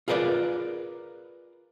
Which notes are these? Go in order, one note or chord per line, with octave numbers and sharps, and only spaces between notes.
F4 G#4 A#4 B4 D5